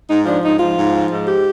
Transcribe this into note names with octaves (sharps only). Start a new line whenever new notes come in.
G#2 D#4
F3 D4
G#2 D#4
F3 F4
G#2
F3
G#2
G4